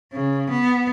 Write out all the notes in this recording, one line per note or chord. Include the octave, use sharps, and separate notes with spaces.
C#3
B3